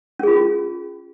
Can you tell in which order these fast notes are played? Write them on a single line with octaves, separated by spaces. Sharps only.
C#4 G#4 F4